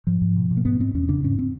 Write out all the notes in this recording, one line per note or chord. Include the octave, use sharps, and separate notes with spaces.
G#2 F3
G#2
B2
B2
A#3
G#2 B3
G#2 C4
E2 C#4
C#3 D4
G#2 C#4
C4